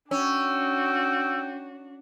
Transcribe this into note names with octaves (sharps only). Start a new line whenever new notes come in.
C#4 D4 F#4 G5 E6